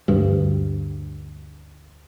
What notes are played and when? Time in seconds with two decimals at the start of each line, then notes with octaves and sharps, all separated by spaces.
0.08 D2 G2